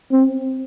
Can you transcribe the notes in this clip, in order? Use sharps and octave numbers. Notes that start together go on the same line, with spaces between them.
C4